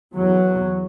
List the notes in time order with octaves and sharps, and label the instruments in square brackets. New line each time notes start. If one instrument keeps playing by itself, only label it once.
[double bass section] E2 F#3